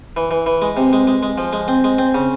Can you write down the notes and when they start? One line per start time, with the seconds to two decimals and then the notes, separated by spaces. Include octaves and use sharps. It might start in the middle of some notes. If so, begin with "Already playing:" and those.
0.17 E3
0.31 E3
0.46 E3
0.62 G#3
0.77 C3
0.93 G#3
1.07 G#3
1.23 G#3
1.38 F3
1.53 G#3
1.68 C4
1.84 G#3
1.98 C4
2.14 C#3